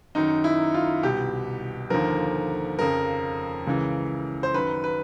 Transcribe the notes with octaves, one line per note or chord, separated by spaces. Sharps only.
F#2 D#3 D#4
E4
F4
C2 B2 G4
D#2 D3 F3 A#4
F2 C#3 F3 A#4
C#2 C#3 E3
C5
F#2 D#3 B4
B4